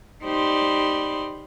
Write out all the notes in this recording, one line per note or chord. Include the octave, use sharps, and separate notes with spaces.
D#4 G4 C5 D5 B5 C6